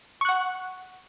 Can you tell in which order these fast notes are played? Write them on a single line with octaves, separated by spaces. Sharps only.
C#6 F#6 F#5